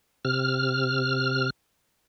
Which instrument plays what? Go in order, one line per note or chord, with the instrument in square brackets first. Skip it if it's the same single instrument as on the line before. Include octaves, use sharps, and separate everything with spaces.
[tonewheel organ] C3 F6